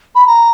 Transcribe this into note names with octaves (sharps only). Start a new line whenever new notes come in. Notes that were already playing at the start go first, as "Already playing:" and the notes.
B5
A#5